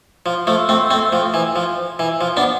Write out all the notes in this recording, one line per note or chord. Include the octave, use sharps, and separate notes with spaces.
F3
F3 A3
A3 C4
A3 C4
F3
E3
F3
E3
F3
B3 D4